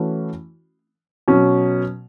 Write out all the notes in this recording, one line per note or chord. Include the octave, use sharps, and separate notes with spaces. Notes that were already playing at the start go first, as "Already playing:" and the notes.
Already playing: E3 A3 C#4 F#4
B2 F#3 C#4